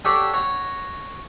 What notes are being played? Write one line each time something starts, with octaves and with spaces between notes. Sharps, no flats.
D4 G4 A4 C#5 D5 F#5
C#5 F#5 A#5